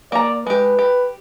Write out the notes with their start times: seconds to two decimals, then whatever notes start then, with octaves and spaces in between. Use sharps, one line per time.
0.12 A#3 D5 A#5
0.47 G#3 G4 B4
0.79 G4